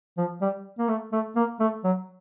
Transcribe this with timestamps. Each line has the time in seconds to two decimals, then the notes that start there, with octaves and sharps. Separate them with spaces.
0.18 F3
0.42 G3
0.78 A#3
0.89 A3
1.12 A3
1.36 A#3
1.60 A3
1.84 F#3